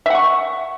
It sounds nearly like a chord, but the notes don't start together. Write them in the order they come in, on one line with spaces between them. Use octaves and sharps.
E5 F#5 C#6